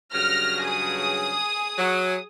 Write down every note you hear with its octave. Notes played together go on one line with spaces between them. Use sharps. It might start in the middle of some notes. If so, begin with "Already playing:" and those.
G2 C#3 F#3 F6 A#6
G#4 D#6
F#3